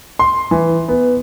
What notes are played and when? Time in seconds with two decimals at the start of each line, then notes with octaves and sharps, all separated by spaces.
0.19 C6
0.51 E3
0.88 B3